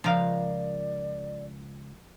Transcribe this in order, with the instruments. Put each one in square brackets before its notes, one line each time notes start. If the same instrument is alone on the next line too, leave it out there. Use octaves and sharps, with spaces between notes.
[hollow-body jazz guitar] C#2 F5 [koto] F3 A#4 [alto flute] D5